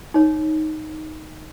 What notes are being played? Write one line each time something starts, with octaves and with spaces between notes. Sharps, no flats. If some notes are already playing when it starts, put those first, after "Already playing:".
D#4 C#5